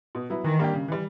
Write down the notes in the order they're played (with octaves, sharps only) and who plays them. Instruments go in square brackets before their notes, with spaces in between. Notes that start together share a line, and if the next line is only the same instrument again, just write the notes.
[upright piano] B2
F#3 B3 E4
[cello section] D#3 [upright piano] E3
[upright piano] G3 A#3 D4 G4
C#3
E3 G3